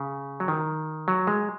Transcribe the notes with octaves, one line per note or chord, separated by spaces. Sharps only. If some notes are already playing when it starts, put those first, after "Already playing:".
Already playing: C#3
F#3
D#3
F#3
G#3